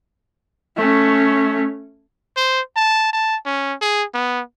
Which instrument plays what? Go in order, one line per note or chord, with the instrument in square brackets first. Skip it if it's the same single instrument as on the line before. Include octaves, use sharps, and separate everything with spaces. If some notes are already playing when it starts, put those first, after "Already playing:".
[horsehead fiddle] A3 C#4
[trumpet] C5
A5
A5
C#4
G#4
B3